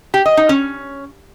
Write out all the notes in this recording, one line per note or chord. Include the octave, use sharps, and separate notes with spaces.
G4
D#5
D#4
C#4